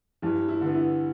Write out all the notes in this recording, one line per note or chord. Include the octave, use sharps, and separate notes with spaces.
G2 E3
E4
D3 B3
E4